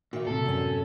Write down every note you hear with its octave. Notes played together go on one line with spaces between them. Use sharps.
A#2 D#3 F#4 E5
A2 C3 A4
F#2 C#4